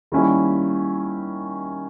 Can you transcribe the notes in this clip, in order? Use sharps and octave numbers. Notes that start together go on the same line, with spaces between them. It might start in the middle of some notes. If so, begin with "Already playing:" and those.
D#3 G3 A#3 C#4 E4